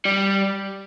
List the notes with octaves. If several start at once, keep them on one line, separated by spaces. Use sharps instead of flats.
G3